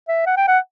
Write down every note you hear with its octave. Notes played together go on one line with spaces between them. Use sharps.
E5
F#5
G5
F#5